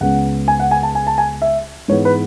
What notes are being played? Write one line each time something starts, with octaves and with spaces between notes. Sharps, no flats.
C#2 C#3 G#3 B3 F#5
G#5
F#5
G#5
A5
G#5
A5
G#5
E5
G#2 E3 G#3 B3 C#5
B4